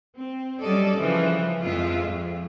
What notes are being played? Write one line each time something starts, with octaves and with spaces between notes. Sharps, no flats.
C4
F#3 G3 C#4 A4 D5 D#5
C#3 E3 F3
F2 G#3 F4 E5
F2